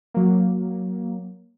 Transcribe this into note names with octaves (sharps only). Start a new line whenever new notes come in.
F#3 A#3